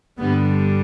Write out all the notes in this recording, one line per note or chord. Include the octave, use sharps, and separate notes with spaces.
G1 G2 D3 G3 B3